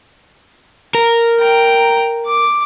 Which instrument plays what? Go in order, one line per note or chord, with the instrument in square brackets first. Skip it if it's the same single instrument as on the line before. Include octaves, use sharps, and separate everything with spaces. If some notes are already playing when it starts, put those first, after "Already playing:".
[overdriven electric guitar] A#4
[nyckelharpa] G5 A#5
D6